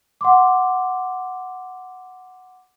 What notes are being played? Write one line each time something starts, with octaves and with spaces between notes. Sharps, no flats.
F#5 C6 D6